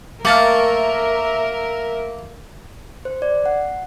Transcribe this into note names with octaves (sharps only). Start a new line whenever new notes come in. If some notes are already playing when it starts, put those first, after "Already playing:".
A3 A#3 A#4 E5 A5 F6
C5
D5
F#5